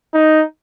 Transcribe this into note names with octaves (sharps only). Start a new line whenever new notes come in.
D#4